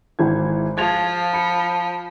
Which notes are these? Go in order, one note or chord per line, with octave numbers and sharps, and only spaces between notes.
G#1 E3 G#6
F3 G#6 A6 F7
B5 C#7